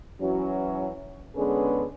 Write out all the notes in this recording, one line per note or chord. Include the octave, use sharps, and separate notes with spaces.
E3 F#3 C#4
D3 G#3 B3 C#4 G#4 B4